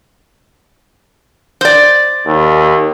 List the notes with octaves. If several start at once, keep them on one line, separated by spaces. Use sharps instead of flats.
C5 D5
D#2